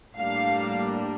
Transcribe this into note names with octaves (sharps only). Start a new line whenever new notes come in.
A2 G3 A#3 D4 F5